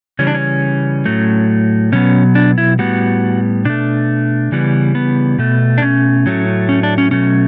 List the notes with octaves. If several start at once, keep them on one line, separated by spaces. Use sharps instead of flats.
C#3 E3 G3 C#4
D4
C#4
A2 F#3 A3
B2 F#3 B3 C#4
D4
E4
A2 G3 B3 F#4
B2 A3 D4
C#3 E3 G3 B3
B3
B2 A3
D4
C#4
A2 F#3 A3
C#4
D4
C#4
B2 F#3 A3 C#4